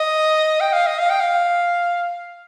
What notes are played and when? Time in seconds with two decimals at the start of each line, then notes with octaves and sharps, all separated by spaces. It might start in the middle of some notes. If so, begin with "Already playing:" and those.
Already playing: D#5
0.60 G5
0.73 F5
0.87 D#5
0.99 F5
1.10 G5
1.20 F5